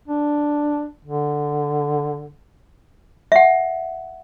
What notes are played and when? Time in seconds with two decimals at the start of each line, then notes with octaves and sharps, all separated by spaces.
0.08 D4
1.05 D3
3.32 E5 F#5